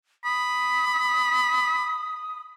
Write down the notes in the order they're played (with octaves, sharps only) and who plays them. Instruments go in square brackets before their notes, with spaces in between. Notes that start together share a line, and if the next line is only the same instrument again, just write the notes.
[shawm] B5 [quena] D#6